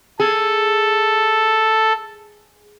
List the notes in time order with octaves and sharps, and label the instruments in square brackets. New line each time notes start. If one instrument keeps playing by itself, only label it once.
[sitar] G#4 [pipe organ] A4